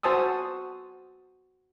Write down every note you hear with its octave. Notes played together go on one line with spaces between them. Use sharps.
F#4 C5 G#5 A5 D#6 E6